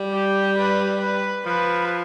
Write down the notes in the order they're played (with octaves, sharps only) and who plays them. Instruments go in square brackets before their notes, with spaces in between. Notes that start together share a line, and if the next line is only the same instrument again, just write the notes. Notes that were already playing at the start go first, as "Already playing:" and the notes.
Already playing: [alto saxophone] G3
[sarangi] G4
B4
B4
[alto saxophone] F3 [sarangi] B4